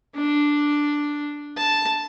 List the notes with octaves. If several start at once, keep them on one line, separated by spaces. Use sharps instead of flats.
D4
A5